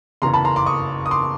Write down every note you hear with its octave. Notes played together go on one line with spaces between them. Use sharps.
F#1 E2 C#3 E3 A#5 C6
A5 B5
A#5 C6
C6 D6
C#6 D#6
D#6
C6 D6